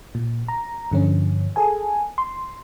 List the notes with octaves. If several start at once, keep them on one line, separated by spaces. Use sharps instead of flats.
A#2
A#5
G2 D3 F3 C#4
G#4 A4 G#5
C6